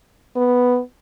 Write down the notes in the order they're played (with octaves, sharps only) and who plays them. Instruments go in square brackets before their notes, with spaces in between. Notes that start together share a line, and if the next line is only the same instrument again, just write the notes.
[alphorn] B3